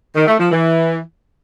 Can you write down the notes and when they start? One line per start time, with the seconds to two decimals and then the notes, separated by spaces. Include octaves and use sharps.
0.15 D#3
0.27 A3
0.39 F3
0.51 E3